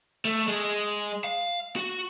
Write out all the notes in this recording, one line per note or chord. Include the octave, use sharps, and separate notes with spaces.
A3
G#3
F5
F#4